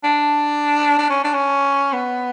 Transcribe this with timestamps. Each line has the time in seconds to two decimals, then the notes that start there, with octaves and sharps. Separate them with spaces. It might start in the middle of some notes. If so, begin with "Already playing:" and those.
0.04 D4
0.98 D4
1.10 C#4
1.24 D4
1.34 C#4
1.93 B3